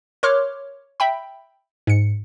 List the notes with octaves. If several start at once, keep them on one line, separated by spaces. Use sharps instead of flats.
A#4 C#5 C6 D6 F6 F#6
E5 G5 B5
G#2 C#7